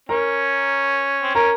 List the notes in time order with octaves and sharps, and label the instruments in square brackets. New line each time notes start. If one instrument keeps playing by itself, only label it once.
[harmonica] C#4 [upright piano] A#4 A#5
[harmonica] C4
[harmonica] C#4 [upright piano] A#4 A#5